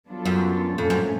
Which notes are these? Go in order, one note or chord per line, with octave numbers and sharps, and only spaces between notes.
F#3 B3 D4 F4 A4
F#2
F2 A#2 F3 A3 C#4
F#2